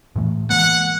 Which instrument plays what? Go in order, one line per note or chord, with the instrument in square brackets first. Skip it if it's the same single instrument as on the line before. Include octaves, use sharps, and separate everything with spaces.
[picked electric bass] A2 E3 A3
[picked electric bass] E3 G#3 A#3 [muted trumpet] F#5